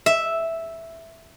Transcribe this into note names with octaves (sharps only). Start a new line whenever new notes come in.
E5